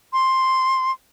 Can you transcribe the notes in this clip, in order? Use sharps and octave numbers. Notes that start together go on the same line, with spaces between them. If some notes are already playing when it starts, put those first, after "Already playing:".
C6